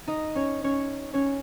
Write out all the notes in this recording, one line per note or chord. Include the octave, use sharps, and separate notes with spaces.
D#4 D#5
C#4 C#5
C#4 C#5
C#4 C#5